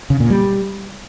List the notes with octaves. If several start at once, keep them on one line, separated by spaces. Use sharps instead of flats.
C#3
A#2
G3